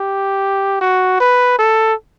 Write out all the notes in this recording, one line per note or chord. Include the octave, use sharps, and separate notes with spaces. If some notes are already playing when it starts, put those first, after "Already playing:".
Already playing: G4
F#4
B4
A4